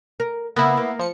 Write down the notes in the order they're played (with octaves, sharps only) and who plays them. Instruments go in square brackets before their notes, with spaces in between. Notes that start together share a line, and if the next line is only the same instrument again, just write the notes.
[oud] A#4
[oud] C#3 A#3 [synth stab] B3 E4
[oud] A#3
[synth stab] F3 C#7